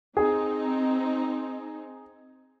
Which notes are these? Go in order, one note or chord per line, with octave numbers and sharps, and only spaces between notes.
C4 D#4 G#4